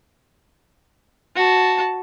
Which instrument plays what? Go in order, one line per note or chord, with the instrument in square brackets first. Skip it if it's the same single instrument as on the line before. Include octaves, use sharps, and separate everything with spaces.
[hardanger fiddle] F#4 A5